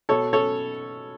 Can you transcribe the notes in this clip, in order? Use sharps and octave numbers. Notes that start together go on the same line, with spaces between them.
B2 A4 C#5
C#4 A4 C#5